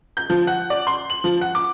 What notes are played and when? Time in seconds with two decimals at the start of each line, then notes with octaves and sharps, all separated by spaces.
0.17 G6
0.30 F3
0.47 F#5
0.70 D5
0.87 C6
1.10 F#7
1.24 F3
1.41 F#5
1.55 D6